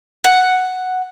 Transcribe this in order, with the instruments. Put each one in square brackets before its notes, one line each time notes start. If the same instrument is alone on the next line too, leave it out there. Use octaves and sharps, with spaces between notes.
[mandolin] F#5